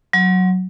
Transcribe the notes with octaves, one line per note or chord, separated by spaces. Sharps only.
F#3